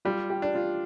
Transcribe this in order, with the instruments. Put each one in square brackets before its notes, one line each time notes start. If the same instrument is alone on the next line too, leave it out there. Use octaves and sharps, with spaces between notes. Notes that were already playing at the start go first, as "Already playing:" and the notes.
[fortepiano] G3 [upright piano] F4
[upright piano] G4
[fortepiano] D4
[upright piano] F4